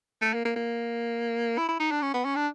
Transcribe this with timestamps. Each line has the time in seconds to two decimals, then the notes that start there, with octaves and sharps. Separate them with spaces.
0.22 A3
0.34 A#3
0.45 A#3
0.56 A#3
1.58 E4
1.68 E4
1.80 D#4
1.91 D4
2.02 C#4
2.14 B3
2.25 C#4
2.36 D4